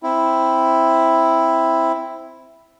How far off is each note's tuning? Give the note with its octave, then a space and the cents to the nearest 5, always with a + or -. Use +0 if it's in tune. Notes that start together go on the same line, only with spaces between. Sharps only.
C4 +0 E4 +0